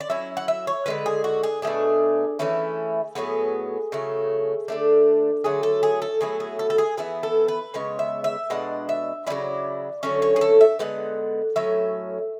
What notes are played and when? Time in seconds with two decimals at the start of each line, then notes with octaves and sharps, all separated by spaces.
0.01 D5
0.10 F#3 C#4 E4 E5
0.37 F#5
0.48 E5
0.67 C#5
0.86 D3 G#3 C#4 B4
1.06 G#4
1.24 F#4
1.43 G#4
1.62 B2 A3 D4 G#4
2.39 E3 A3 C#4 E4
3.15 A2 F#3 B3 G#4
3.92 C#3 F#3 A3
4.68 D3 A3 D4
5.44 D3 F#3 A3 G#4
5.63 A4
5.83 G#4
6.02 A4
6.21 A2 F#3 B3 E4 G#4
6.40 G#4
6.59 A4
6.70 A4
6.78 G#4
6.97 E3 B3 E4 G#4
7.23 A4
7.48 B4
7.74 C#3 G#3 B3 C#5
7.99 E5
8.24 E5
8.50 B2 G#3 D4 F#5
8.89 E5
9.27 C#4 E4 D5
9.30 C#3 F#3
10.03 D3 F#3 A3 C#4 C#5
10.22 C#5
10.36 G#4
10.41 A4
10.61 E5
10.79 D3 G#3 B3 F#5
11.56 A2 F#3 C#4 E5